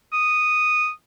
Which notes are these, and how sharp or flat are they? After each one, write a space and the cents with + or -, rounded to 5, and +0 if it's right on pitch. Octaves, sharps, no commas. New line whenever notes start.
D#6 -5